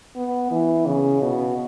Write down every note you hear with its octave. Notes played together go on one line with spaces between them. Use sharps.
B3
E3
C#3
B2